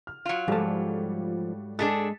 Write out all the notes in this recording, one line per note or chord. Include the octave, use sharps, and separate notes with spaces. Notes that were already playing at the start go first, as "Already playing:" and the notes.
F6
F#3 F4
G#2 F3 G3 A3 A5
G#3 D4 G#4 A4 A6 B6 E7